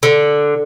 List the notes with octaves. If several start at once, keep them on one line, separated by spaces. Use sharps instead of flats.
D3